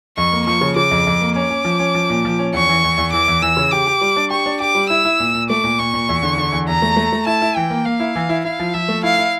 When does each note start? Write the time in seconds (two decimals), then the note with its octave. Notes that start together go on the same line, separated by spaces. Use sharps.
0.17 F2 C#6
0.32 A#3
0.46 F3 C#6
0.61 C#3
0.76 C#3 D6
0.91 F2
1.06 F2
1.21 A#3
1.36 C#4 D6
1.50 C#4
1.65 F3
1.79 C#4
1.95 F3
2.10 A#2
2.25 F3
2.39 C#4
2.53 E2 C#6
2.69 E3
2.84 E2
2.98 E2
3.13 E3 D6
3.28 E2
3.42 E3 E6
3.57 C#3
3.72 G4 D6
3.87 G4
4.01 G3
4.16 D4
4.30 G4 C#6
4.46 D4
4.60 G4 D6
4.75 G3
4.90 E4 E6
5.05 E4
5.20 A#2
5.34 A#2
5.50 A3 D6
5.64 A#2
5.79 A#2 C#6
5.94 A#2
6.09 E2
6.22 D3
6.38 D3
6.52 E2
6.68 E2 A#5
6.82 A3
6.96 A3
7.12 A3
7.26 E4 A5
7.42 E4
7.56 E3 G5
7.70 A#3
7.86 A#3 F5
8.00 E4
8.15 E3
8.29 E4
8.45 E4 F5
8.59 F3
8.74 F3 E5
8.88 A3
9.03 E4 F5
9.18 E4